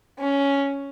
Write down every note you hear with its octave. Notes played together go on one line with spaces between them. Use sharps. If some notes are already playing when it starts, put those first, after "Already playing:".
C#4